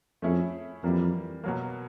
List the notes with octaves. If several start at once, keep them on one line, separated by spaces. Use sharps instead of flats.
F2 A3 C#4 E4 G#4
F2 E3 G3 A#3
B2 F#3 A#3